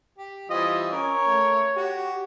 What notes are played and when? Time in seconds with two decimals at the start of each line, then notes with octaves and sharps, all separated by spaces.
0.18 G4
0.50 E3 G3 C4 F4 D#5
0.92 C#4 A#4 C#5
1.27 A3
1.76 F#4 G4